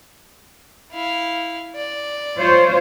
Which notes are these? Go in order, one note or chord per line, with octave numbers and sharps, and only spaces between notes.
E4 F5
D5
F4 C5 C#5